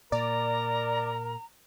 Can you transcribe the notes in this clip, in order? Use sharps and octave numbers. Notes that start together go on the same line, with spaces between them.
A#2 A#4 D5 A#5